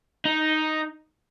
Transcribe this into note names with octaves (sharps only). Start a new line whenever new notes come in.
D#4